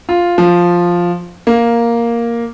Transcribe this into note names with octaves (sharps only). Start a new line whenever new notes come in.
F4
F3
A#3